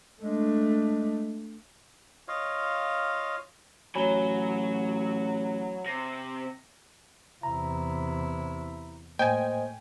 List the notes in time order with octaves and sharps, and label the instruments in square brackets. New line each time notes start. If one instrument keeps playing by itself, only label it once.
[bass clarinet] G#3 [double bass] A3 D4
[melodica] F4 C#5 D#5 F5
[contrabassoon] A1 [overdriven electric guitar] F#3 [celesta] C#5 G7 [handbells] G#5 B5
[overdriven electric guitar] C3 [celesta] A#6
[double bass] E2 C3 [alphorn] E4 [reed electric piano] A#5
[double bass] A2 [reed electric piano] A#3 C5 D#5 [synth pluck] G5 G#5